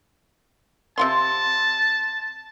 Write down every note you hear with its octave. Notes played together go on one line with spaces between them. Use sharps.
C3 F4 A5 C6